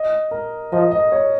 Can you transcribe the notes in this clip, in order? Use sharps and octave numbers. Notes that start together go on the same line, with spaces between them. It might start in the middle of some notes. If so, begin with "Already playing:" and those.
Already playing: D#5
A#4
F3 D#5
D#5
C#5